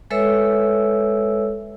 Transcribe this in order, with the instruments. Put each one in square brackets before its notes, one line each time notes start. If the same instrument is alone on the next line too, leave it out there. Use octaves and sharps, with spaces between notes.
[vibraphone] G#3 A4 B4 C#5 E5 E6